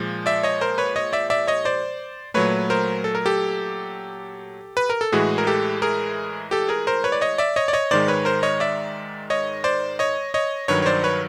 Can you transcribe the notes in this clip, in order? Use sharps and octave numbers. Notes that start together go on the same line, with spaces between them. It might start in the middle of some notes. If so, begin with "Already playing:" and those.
Already playing: A#2 F3 G#3
D5 E5
C#5 D#5
A#4 C5
B4 C#5
C#5 D#5
D5 E5
D5 E5
C#5 D#5
C5 D5
A#2 F#3 A3 B4 C#5
A#4 C5
A4
A#4
G4 A4
B4
A#4
A4
A2 E3 G#3 F#4 G#4
A#4
G4 A4
G#4 A#4
G4 A4
G#4 A#4
A#4 C5
B4 C#5
D5
C#5 D#5
D5 E5
C#5 D#5
D5
C#5 D#5
G#2 D#3 G#3 C5 D5
B4 C#5
A#4 C5
C#5 D#5
D5 E5
C#5 D#5
C5 D5
C#5 D#5
C#5 D#5
G2 D#3 F#3 B4 C#5
C#5
C5 D5
B4 C#5